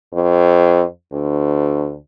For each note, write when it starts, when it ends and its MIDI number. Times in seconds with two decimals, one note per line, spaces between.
0.14 0.83 41
1.12 1.95 38